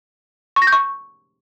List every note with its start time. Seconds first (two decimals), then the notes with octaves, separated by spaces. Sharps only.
0.56 C#6
0.62 A#6
0.67 G6
0.73 C#6